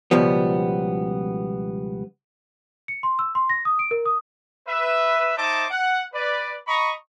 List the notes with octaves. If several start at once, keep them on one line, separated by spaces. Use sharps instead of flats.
C#2 B2 F3 G3 B3
C#7
C6
E6
C6
A#6
D#6
D7
A#4
D#6
B4 E5
D#4 C5 D#5 E5 A5 D6
F#5
B4 D5
D#5 A#5 B5 C#6